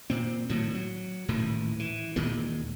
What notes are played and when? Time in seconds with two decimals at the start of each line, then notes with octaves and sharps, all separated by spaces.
0.10 A#2 C4
0.49 A2 D#3 F#3
0.75 F#3
1.28 D#1 A2 D#3 E3
1.79 E3
2.16 D#2 A#2 D#3 G#3